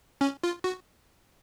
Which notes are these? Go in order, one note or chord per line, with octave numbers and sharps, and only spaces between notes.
C#4
F4
F#4